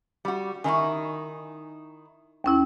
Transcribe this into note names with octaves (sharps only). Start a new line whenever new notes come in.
G3 F#4
D#3 D#4 E4 G#5 C#6
D#2 C#4 E4